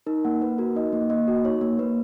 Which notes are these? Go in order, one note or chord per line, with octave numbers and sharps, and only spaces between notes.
D#4 A#4
A#3 F#5
A#3 B4
F#4 A#4
D#4 D#5
A#3
A#3 D#5
F#4
D#4 C#5
A#3
A#3 B4